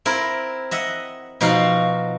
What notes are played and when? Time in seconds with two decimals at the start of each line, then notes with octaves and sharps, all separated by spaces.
0.05 C4 E4 A#4
0.71 D#5 E5 F#5
1.41 B2 F3 D#4 F#4 F5